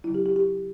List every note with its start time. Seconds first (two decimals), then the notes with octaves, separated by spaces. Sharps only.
0.04 C#3 F#3 E4
0.14 G4
0.26 G4
0.36 G4